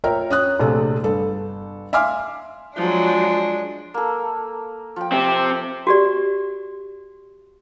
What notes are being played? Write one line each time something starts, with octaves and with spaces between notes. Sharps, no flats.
F4 A#4 C#5 E5 G5 A#5
C#4 D#6 F#6
A#1 C3 A3
G1 A4
E5 F5 G#5 C6 D6 F6
F3 F#3 G#3 D4
A#3 A4
F3 G5
C4 G4
F#4 G4 D5